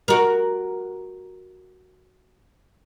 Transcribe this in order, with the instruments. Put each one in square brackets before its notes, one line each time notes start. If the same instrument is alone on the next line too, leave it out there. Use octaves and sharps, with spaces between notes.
[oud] F#4 A#4